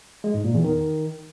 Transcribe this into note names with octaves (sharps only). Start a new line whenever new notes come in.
G#3
G#2
A#2
E2
D#3